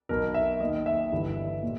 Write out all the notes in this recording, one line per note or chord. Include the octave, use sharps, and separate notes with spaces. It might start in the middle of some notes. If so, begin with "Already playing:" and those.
B1 B2 A#4
E5
D#2 D#3 D#5
E5
G1 G2 E3
A#2